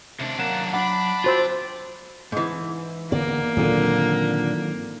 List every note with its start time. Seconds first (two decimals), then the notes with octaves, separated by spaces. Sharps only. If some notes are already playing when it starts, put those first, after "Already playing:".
0.20 D#2 C3 D4
0.39 F#3 A#3 F#5 A5
0.74 D4 F#5 B5 D6
1.24 F4 F#4 C5 E6
2.32 G#2 E3
3.12 D3 A#3 B3 D5
3.57 A#2 D3 D#3 F#3 C4